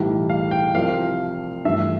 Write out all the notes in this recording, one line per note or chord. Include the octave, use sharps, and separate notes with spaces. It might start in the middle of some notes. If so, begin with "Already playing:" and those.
Already playing: B1 A2 E3 G3
F5
G5
C2 C3 F3 F5
G2 E3 A3 D4 F4 E5